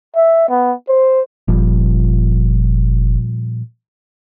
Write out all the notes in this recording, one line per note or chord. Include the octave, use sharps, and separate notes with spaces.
E5
B3
C5
F#1 A#2 F3 G3